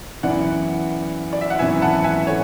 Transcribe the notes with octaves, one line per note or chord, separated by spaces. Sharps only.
F#2 E3 B3 E4 D5 F#5
D5
E5
F#5
G#1 F#2 E3 B3 E4 E5 G#5
F#5 A5
E5 G#5
A4 C#5